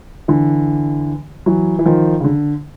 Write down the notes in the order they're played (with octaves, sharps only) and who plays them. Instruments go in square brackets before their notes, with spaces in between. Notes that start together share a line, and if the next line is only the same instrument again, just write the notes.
[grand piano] D3 E3
E3 F#3
E3
D#3 F3
C#3
D3